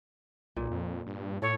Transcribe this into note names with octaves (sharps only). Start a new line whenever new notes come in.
B1 A#2
F2
G2
A2 A4 C#5